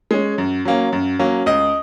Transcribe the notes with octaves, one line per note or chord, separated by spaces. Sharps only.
G#3 C#4
F#2
F#3 A#3 C#4
F#2
F#3 A#3 C#4
C#2 D#5 D#6